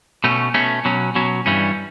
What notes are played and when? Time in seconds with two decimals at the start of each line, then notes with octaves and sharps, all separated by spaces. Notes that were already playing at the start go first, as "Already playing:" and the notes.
0.24 B2 A3 C#4
0.54 B2 A3 C#4
0.85 B2 F#3 C#4
1.15 B2 F#3 C#4
1.46 G2 E3 G3 C#4